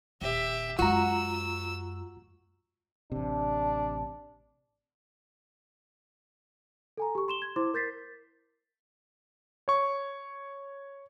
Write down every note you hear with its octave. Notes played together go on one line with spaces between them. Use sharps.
D#1 G4 E5
F#2 G#3 F4 F#4 A#5 E6
A1 C3 D4
A4 G#5 A#5
G4 C#6
C6 E7 G7
G#6
E4 C5 C6 D6
A#4 G6 A6 B6 C7
C#5 C#6